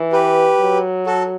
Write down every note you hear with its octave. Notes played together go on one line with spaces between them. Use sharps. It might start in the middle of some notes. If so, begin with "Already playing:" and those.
Already playing: E3
G4 B4
F#3
F#4 A4